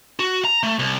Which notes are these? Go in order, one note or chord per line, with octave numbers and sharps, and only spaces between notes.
F#4
A#5
A3
C2